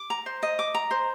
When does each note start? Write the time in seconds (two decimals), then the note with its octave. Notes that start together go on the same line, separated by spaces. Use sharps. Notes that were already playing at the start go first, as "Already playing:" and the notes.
Already playing: D6
0.10 A#5
0.26 C5
0.43 D#5
0.59 D6
0.75 A#5
0.91 C5